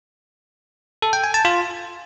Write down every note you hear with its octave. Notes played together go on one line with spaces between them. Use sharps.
A4
G5
G#5
A5
F4